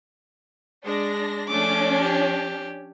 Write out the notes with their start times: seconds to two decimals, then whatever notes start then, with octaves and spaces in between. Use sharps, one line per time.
0.85 G#3 D4 A#6
1.48 F3 A3 C#4 D4 D6
2.02 G4